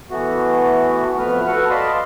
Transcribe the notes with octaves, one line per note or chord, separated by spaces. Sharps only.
E3 A3 B3 F#4
F2 A3 B3 B4 F6
F#4 A4 B4 F#5 F6
D5 D#5 F5 A5 B5 C6